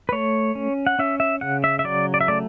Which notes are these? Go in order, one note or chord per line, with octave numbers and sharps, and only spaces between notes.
B4
A3 C#5
C#4
F#5
C#4 E5
E5
C#3 F#5
E5
E5
F#3 D5
D5
E5
A3 D5